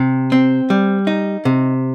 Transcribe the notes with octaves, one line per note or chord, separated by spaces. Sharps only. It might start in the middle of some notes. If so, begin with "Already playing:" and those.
Already playing: C3
C4
G3
D#4
C3